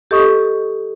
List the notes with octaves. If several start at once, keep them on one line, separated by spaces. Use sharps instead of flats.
G4 A4 D#5 C#6 D#6